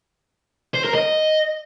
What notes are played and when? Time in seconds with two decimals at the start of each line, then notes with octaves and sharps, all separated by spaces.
0.74 C5
0.84 A#4
0.94 D#5